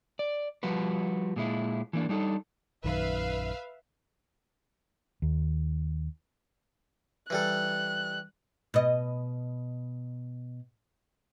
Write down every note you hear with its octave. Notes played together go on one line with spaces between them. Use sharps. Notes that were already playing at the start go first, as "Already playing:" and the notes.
D5
F3 G3 F#4 B4
A#2 G#3 E4
E3 A#3 D4
G3 D4 D#4 G4 A4
A#1 F#2 D#3 B4 E5 F5
D#2
E3 G3 A4 F#6
B2 D#5